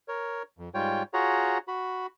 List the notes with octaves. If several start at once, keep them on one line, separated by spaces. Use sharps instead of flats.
A#4 C#5
F2
G#2 G3 F4 C#5 G5
F4 F#4 G#4 C#5 F#5 A#5
F#4 B5